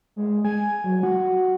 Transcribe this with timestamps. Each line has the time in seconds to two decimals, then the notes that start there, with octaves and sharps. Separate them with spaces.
0.16 G#3
0.45 G#5
0.84 F#3
1.03 F#4